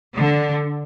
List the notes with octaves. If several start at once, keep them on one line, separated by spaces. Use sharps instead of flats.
D3